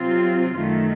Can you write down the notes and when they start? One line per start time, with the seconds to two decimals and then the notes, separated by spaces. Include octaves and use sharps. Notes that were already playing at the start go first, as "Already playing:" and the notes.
Already playing: C3 F#3 C4 F4
0.55 F#2 D#3 A3